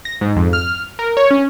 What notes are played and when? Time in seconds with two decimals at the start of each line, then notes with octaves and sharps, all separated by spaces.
0.05 A#6
0.21 G#2
0.36 F2
0.53 F6
0.99 A#4
1.17 C#5
1.31 C#4